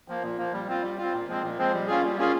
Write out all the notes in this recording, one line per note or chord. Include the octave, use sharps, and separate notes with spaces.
F3 A#3
A#2
F3 A#3
G3
C4 F4
G3
C4 F4
A#2
F3 G#3 C4
A#2
F3 G#3 C4
G3
A#3 C#4 F4 G#4
G3
A#3 C#4 F4 G#4